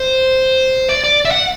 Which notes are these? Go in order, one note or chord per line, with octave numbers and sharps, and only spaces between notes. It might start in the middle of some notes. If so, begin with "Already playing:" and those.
Already playing: C5
D5
D5
E5
F#5